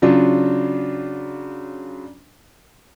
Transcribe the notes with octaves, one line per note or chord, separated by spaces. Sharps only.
C#3 F#3 D4 F4